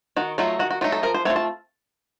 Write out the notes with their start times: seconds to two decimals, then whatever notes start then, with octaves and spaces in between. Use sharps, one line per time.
0.17 D#3 F#4
0.38 F#3 A3 D#4 F4
0.59 D#3 F#4
0.70 F#4
0.81 F#3 A3 D#4 F4
0.92 A4
1.03 F3 A#4
1.14 C5
1.25 A3 C4 F4 C#5
1.36 A5